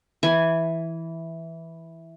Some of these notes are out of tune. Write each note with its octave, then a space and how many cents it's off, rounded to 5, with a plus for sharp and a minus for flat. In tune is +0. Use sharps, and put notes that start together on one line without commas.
E3 -5 G#5 +0